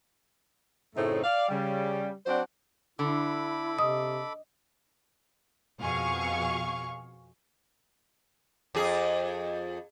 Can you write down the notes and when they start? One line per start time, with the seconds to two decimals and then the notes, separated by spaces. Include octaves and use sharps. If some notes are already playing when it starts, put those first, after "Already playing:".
0.95 F#2 A2 C#3 A3 C4 D#4
1.23 D5 F5
1.49 C#3 G3
2.26 F#3 C4 D4 C5 D5 F#5
2.99 D3 E4 A4 B5 D6
3.79 C3 D#5 D#6
5.79 F2 B2 G#4 F5 C#6
8.75 F2 G#4